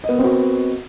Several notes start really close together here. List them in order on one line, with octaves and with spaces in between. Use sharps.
D#5 B3 A#4 C4 F#4